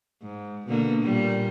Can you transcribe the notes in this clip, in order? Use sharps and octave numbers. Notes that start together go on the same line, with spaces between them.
G#2
B2 D3 A#3
A#2 G3